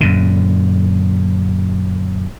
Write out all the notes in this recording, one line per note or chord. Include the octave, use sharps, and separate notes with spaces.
F#2 A#2 D3